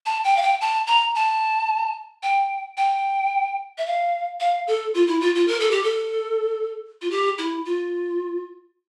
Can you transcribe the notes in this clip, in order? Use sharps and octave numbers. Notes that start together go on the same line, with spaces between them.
A5
G5
F5
G5
A5
A#5
A5
G5
G5
E5
F5
F5
A4
F4
E4
F4
F4
A#4
A4
G4
A4
F4
G4
E4
F4